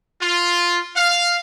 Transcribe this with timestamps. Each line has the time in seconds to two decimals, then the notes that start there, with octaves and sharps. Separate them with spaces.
0.21 F4
0.96 F5